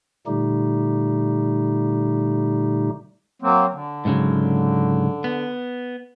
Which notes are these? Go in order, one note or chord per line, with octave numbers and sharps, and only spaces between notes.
A#2 D3 G3 A3 D#4 G4
F#3 A#3 C4
D3
G#2 C#3 F#3
B3